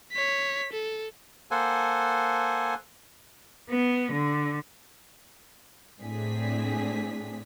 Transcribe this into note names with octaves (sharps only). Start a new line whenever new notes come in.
C#5 B6
A4
A#3 A4 C5 F#5 G#5
B3
D3
A2 C4 D4 G#4 B6